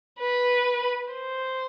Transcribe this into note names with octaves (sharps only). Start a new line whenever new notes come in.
B4
C5